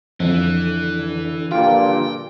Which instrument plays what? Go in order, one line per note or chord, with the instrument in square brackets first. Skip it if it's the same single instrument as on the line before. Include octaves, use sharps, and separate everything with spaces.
[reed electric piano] F2 [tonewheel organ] D3 [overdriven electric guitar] E3
[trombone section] A#1 G2 A#2 [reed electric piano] F4 [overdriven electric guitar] G5